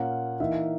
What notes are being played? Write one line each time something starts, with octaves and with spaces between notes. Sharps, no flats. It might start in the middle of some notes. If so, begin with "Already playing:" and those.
Already playing: A#2 A#3 C#4 F#5
E3 A#3 D#4 E5